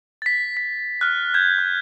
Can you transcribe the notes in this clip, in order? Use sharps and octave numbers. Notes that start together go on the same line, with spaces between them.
A6 B6
B6
F6 F#6
G6 G#6
F#6